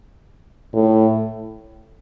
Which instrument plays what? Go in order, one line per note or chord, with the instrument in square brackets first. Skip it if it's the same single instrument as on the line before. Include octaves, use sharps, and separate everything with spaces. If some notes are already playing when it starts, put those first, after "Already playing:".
[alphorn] A2